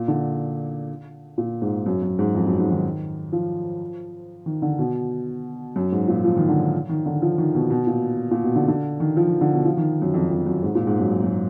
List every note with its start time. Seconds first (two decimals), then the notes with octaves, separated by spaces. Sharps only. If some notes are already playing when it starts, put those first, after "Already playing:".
Already playing: A#2
0.08 D3
1.38 A#2
1.62 G#2
1.86 F#2
2.02 F#2
2.19 G#2
2.35 F2
2.47 F#2
2.60 G#2
2.71 D#3
3.32 F3
4.46 D#3
4.62 D3
4.79 B2
5.76 F#2
5.92 G#2
6.08 A#2
6.24 F3
6.37 D#3
6.48 D3
6.89 D#3
7.06 D3
7.22 F3
7.38 D#3
7.55 B2
7.70 B2
7.87 A#2
8.31 A#2
8.44 B2
8.56 D3
8.68 D3
9.00 D#3
9.17 F3
9.29 D#3
9.41 D3
9.53 B2
9.65 F3
9.77 D#3
10.02 F#2
10.14 F2
10.30 F2
10.46 F#2
10.63 G#2
10.75 A#2
10.87 G#2
10.99 F#2
11.12 F#2
11.24 F#2